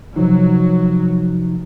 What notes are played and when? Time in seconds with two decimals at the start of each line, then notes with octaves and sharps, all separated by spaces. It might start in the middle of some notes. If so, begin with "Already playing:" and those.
0.16 C3 F3 F#3 D#4